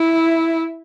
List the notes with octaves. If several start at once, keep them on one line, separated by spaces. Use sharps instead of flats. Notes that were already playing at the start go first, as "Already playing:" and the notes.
Already playing: E4